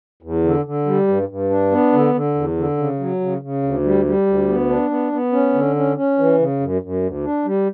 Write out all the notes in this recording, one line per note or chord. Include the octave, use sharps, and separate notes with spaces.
E2
D3
D3
G3
G2
G2
D4
B3
D3
D3
E2
D3
C#3
F#3
C#3
C#3
D2
G3
G3
D2
B3
D4
B3
B3
C#4
D3
C#4
C#4
E3
C#3
F#2
F#2
D2
D4
G3